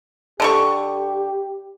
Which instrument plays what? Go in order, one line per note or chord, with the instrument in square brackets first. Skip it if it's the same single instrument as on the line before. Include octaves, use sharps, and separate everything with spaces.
[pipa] D3 A4 C#6 [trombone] G4